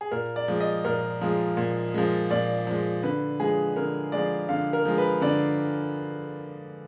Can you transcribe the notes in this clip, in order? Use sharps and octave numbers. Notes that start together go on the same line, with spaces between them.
G#4
A#2 A#4
D5
F3 G#3
D#5
A#2 A#4
F3 G#3
A#2
F3 G#3
A#2 D5
F3 G#3
D3 B4
F3 G#3 G#4
D3 A#4
F3 G#3 D5
D3 F5
A#4
F3 G#3
B4
D3 D5